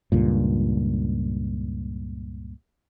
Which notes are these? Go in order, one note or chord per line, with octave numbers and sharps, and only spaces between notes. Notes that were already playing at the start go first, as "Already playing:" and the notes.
C#2 G2 A#2